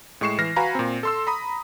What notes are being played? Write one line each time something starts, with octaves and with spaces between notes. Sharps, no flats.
A2 G#3 C#6 C7 E7
E3 F6 A#6 C7
F#4 B4 F5 G#5 A#5 B5
A#2 C4
A4 C6 E6
A#5 B5 D#6